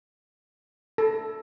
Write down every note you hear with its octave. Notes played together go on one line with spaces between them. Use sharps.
A4